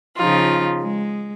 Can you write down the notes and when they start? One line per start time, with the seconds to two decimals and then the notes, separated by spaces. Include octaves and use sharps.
0.17 C#3 F3 D#4 F4
0.82 G#3